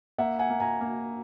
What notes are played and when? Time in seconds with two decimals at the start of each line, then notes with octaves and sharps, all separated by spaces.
0.18 A#3 E5 F#5
0.39 F#5 G#5
0.50 A#3
0.60 G#5 A#5
0.81 A#3